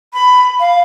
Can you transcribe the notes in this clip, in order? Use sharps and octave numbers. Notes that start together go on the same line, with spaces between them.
B5
F5